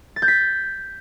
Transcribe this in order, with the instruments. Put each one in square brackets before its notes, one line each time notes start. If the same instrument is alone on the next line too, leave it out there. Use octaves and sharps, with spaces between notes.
[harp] A6
G6
B6